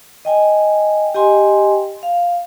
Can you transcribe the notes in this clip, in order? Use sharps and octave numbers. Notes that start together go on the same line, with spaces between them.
D#5 G5 G#5
G4 D#5 G5 G#5 C6
F5